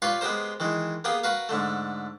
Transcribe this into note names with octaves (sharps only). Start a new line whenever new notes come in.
F4 G4 B4 C#5 D5 F5
G#3 B3 G4 A#4 C5
D#3 E3 G#3
A#3 B3 G4 G#4 A#4
F#4 A#4 B4 F5
G#2 D3 A3